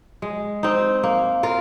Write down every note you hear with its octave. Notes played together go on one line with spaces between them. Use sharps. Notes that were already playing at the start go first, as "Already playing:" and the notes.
G#3
C4 D#4
A#3
F4 A#4